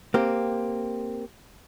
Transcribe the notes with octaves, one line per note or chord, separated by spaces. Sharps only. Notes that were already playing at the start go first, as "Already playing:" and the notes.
A#3 C4 G4